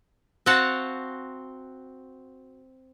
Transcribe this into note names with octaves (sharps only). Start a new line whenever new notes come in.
C4 F#4 F5 F#5 A5